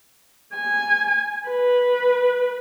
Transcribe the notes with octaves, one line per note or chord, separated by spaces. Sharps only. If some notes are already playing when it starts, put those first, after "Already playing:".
G#5
B4